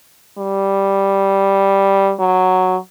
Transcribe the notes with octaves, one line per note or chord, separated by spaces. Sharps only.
G3
F#3